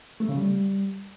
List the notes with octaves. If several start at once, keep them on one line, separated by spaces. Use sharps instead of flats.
A3
C#3
G3